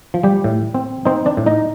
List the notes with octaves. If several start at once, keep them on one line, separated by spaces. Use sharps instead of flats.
F3
G3 G4
A2
C4
C4 D#4 C5
D4 D5
A2
D#4 D#5